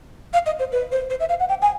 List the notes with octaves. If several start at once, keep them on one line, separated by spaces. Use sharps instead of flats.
F5
D#5
C5
B4
C5
C5
E5
F5
F#5
G5
G#5